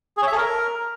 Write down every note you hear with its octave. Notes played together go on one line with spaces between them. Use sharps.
G#4
C#5
E5
A4
A#4